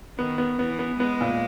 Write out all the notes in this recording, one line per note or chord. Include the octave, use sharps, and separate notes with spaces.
D#3 B3
B3
E3 B3
B3
G#3 B3
A#2